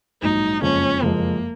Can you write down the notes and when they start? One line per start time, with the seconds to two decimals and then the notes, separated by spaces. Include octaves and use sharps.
0.22 A#1 G#2 F#3 D#4
0.62 F#1 F2 F3 G#3 C#4
1.02 F#1 F2 F3 G#3 A#3